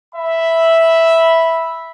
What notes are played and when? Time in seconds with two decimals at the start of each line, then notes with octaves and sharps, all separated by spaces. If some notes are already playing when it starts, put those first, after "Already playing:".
0.15 E5 B5